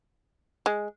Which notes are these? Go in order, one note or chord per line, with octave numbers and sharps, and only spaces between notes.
G#3